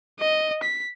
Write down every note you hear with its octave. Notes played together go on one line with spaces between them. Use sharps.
D#5
B6